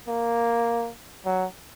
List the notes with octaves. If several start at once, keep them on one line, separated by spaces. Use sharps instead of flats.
A#3
F#3